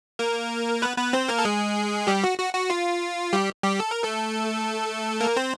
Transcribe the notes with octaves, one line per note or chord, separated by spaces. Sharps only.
A#3 A#4
B3 B4
B3 B4
C4 C5
A#3 A#4
A4
G#3 G#4
G3 G4
F#4
F#4
F#4
F4
G3 G4
G3 G4
A4
A#4
A3 A4
A#3 A#4
C4 C5